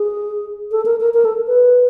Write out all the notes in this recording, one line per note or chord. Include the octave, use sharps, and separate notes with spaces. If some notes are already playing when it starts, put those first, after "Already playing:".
Already playing: G#4
A4
A#4
A#4
A#4
A4
B4